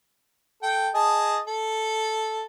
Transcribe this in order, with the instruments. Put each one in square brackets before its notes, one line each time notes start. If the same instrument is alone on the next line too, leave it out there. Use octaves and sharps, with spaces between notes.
[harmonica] A4 G5
G#4 D#5 A5
A4